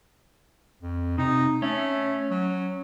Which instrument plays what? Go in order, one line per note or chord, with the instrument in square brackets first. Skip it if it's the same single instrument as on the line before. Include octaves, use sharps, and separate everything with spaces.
[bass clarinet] F2
[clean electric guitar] C3 [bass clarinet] D#4
[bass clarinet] A3 [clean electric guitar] C#4
[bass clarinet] F#3